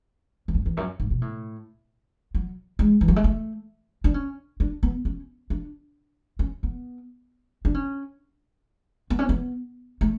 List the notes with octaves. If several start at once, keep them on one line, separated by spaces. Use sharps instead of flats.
E2
F#2
E2
F#2
G#2
B2
A2
F#3
G#3
E3
F#3
G#3
A3
D4
C#4
D4
B3
C#4
D4
C#4
B3
D4
C#4
B3
C#4
B3
A3